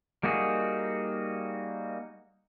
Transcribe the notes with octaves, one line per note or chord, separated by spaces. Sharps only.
G3 A#3 D#4 F#4 G#4